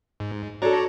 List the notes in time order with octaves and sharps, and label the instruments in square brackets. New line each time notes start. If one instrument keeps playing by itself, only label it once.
[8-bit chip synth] G#2
[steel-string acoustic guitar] D4 A4 [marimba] F#4 [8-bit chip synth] C#5 D5 A#5